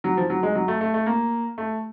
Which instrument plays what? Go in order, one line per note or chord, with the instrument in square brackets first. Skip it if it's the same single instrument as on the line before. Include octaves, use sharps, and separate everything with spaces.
[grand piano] F#3
F3
F#3
G#3
F#3
A3
A3
A3
A#3
A3